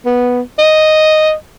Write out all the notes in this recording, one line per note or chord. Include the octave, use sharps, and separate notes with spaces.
B3
D#5